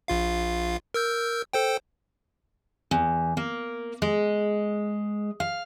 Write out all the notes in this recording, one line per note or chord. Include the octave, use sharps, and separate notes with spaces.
A#1 F4 F5
A#4 E6 G6
A4 C5 G5
E2
A#3
G#3
F5